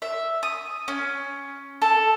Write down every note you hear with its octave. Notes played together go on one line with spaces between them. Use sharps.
E5
D#6
C#4
A4